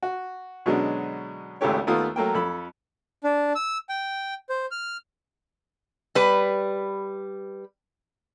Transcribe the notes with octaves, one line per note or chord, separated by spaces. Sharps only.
F#4
B2 D3 F#3 G#3 C#4 D4
G#1 C#2 G#3 A3 G4 C#5
D#2 A3 B3 F4 D#6
F#3 A3 A#3 G5
F2 A4 B5
D4
E6
G5
C5
F6
G3 B4